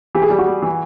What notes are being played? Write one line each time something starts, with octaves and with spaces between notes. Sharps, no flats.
E3 G4
G#4
G3 G4
F#4
G3
E3